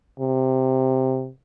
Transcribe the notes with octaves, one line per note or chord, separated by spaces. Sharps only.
C3